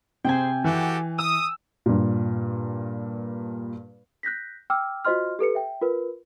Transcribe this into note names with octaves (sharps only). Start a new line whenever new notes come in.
C3 G#4 C5 G5 G#5
E3 F#4 G4 A4
D#6 E6
G2 A#2
F#6 G6 A#6 B6
G5 D6 E6 F6
F4 F#4 C5 D#5 C6 F6
G4 A4 B4 C#7
E5 G5
F4 A#4 B4